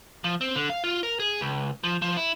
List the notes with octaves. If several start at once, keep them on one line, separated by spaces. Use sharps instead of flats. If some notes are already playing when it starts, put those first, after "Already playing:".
F3
C4
D3
F5
F4
A#4
G#4
C#2
F3
F3
E4